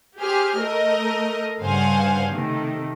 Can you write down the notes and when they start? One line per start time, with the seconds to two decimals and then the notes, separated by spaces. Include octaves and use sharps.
0.19 G4 G#4 C5 F6
0.58 A3 A#4 D#5
1.61 G2 C#3 C5 F5 F#5 G#5
2.31 C3 D#3 A3